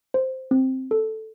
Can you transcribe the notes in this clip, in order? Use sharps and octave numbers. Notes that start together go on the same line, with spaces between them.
C5
C4
A4